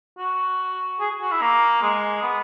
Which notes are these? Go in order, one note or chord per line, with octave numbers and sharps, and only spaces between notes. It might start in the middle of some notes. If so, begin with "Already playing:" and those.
F#4
G#4
F#4
E4
A#3
G#3
B3